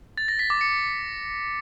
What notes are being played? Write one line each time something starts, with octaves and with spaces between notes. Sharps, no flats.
A6
A#6
B6
D6
C#7